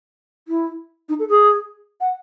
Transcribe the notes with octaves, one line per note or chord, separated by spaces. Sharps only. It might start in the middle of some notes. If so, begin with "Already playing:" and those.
E4
D#4
A4
G#4
F#5